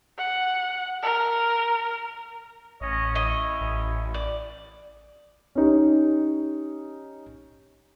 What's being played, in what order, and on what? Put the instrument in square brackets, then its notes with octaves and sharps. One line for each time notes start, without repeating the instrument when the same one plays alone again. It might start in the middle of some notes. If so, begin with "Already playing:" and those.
[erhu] F#5
A#4
[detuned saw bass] A1 [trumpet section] C#4 C#5 D#5
[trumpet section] C#4 E4 C#5 [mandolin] D#5
[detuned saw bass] A1
[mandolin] D5
[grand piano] C#4 D#4 G4